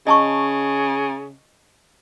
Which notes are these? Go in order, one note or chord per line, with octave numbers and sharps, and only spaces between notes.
C#3 D#5 A5 C#6